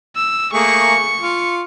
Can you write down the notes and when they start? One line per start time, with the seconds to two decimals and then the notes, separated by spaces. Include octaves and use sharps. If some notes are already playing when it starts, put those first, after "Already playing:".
0.16 E6
0.53 A3 A#3 G#4 C#6 C#7
1.21 F4